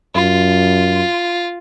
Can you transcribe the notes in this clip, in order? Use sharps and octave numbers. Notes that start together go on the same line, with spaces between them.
F#2 F4